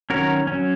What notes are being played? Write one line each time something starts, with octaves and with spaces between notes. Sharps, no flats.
D#3 F#3 C#4 F#4 A#4
F#3 C#4